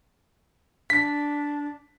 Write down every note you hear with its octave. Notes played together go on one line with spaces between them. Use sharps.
D4 B6